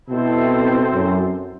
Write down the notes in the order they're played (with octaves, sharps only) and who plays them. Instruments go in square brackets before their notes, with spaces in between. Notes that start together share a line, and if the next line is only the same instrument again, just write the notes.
[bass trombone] B2 [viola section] C4 E4 A4 C5
[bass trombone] F#2